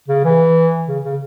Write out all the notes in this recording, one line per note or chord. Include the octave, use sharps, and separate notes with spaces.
C#3
E3
C#3
C#3